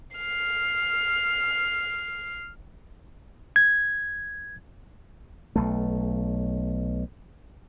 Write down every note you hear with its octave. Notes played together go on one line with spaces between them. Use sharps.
F6 C7
G#6
B1 A3